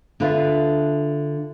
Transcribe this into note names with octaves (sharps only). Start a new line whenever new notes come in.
D3 D4 F4 B4 E5 F5